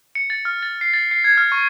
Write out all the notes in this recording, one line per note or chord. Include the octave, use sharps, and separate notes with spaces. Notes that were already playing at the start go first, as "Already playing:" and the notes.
C#7
A6
F6
A6
C7
A6
C7
G#6
F6
C#6